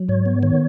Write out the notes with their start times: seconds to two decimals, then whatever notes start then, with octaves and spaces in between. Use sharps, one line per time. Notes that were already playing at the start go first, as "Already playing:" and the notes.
Already playing: F#3
0.09 G#2 C#5
0.26 B3
0.43 D#3 C#5